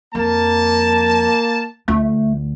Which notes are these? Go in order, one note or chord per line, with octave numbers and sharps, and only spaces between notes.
F2 A#3 A5
D2 A3 F4